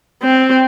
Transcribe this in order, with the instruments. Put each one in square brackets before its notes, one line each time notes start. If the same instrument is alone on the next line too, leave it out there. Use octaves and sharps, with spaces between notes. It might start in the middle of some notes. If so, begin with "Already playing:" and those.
[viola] C4